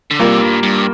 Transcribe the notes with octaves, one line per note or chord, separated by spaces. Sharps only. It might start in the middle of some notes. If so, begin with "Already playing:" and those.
D3
C3 G3 A#3 F4 A#4
G2
G2